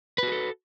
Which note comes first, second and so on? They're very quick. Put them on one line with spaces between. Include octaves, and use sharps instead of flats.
B4 F#4 G#4 A4